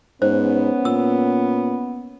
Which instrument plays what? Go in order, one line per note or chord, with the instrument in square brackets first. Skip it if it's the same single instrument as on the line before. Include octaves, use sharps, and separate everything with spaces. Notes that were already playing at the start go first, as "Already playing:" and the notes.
[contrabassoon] G#2 [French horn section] B3 [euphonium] C#4 [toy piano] C5
[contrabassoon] A#2 [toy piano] E6